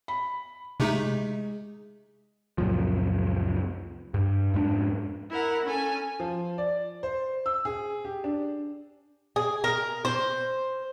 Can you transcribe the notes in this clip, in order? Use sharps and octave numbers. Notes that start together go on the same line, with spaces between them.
B5
C3 G#3 A3 D#4
C#2 F#2 A#2 F3
G2
F2 G#2 B3 D4
E4 A#4 F#5
C#4 A4 G#5
F3
D5
C5
E6
G#4
G4
D4
G#4
A#4
C5